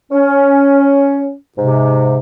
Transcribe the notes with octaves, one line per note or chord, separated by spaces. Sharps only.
C#4
G#2 C3